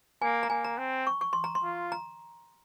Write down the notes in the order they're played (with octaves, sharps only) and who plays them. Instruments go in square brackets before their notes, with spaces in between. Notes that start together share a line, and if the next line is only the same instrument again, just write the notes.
[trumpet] A#3 [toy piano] G#5
[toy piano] A#5
[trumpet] A#3 [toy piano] G#5
[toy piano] A#5
[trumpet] C4
[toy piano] C#6
C#6
C6
A#5
C6
[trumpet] F4
[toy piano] A#5